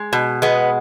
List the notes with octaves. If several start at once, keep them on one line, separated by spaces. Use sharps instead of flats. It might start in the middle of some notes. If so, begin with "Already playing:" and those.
Already playing: G#3
B2
G#3 B3